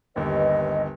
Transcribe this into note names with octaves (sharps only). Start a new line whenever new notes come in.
G1 D#2 B4 D#5